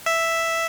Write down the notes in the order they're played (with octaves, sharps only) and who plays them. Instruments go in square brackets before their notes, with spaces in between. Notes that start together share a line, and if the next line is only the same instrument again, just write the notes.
[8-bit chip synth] E5